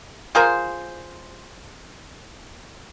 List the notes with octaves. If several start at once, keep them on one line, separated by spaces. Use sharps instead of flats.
F4 G#4 A#4 C5